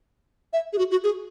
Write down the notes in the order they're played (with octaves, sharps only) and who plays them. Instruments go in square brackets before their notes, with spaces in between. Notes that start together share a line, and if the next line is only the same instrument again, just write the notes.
[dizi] E5
G#4
F#4
F#4
G#4